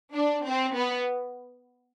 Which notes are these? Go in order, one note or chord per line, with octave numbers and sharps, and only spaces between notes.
D4
C4
B3